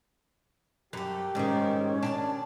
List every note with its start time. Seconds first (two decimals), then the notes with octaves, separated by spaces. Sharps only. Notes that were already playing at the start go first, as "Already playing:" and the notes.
0.93 F#2 G3 A3 G4
1.35 G#2 D#3 G#3 C#4 D5
2.03 B2 D4 D5 A5